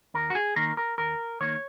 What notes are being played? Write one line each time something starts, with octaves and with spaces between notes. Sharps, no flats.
D#2 A#4
F#4
G#4
D#3 A#3 A#4
A#4
D#2 A#4
D#3 A#3 C#5